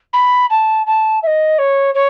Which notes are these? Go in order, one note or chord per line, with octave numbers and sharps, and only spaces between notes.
B5
A5
A5
E5
D#5
C#5
C#5